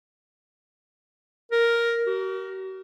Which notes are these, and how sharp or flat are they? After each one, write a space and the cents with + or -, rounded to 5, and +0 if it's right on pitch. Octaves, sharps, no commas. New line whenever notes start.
A#4 +5
F#4 +45